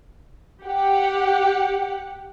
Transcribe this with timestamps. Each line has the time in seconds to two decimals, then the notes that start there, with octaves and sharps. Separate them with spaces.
0.64 G4 F#5